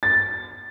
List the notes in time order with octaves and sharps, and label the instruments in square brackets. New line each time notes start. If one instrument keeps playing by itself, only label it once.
[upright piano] A6